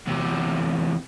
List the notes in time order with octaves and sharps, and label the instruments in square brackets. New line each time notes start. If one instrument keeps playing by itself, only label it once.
[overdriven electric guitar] E2 C3